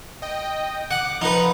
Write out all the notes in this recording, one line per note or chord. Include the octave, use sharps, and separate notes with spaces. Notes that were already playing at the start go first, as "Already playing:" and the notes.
D#5 G5
F#5 D6
F3 D#4 B4